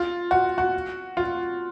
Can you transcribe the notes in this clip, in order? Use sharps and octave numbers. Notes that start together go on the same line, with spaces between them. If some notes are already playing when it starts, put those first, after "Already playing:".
Already playing: F4
F#4
F#4
F4